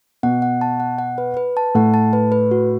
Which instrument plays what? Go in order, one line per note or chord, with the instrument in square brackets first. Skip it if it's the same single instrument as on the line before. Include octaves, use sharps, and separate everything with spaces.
[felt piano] B2 [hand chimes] F#5
[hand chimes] F#5
A5
F#5
F#5
B4
B4
A5
[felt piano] A2 [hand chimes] F#5
[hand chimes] A5
B4
B4
F#4